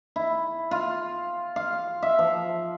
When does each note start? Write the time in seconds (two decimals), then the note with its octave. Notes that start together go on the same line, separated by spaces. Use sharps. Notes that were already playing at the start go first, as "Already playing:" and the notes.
0.16 E4
0.71 F4
1.56 F5
2.03 E5
2.19 F3